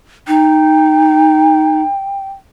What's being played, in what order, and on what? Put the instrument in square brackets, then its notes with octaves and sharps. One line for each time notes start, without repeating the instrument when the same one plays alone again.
[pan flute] D#4 [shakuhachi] G5